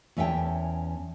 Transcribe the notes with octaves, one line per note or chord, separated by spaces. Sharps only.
E2 C#4 E5 F5 G5 A5